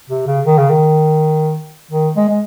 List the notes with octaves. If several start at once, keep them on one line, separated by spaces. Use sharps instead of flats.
C3
C#3
D#3
C#3
D#3
D#3
G#3
G#3